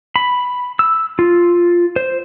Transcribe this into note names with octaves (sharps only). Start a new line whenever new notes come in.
B5
E6
F4
C5